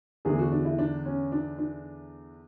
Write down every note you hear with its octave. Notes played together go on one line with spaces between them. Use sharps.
E2 D3 A3 G#4
F#4
D4
E4
D4
C#4
D4
D4